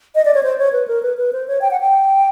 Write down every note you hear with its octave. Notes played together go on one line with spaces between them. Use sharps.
D#5
D5
C#5
C5
C#5
B4
A#4
B4
B4
C5
C#5
G5
F#5
G5